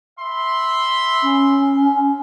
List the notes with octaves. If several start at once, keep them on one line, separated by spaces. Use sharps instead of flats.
E5 B5 C6
C#4